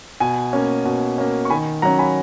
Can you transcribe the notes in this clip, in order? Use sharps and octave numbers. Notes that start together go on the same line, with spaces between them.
B2 G#5
A#3 C#4
B2
A#3 C#4
C#6
D#3 G#5 B5
F#3 C#4 F#5 A#5
G#5 B5